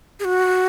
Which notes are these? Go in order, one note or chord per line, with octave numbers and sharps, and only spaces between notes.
G#4
F#4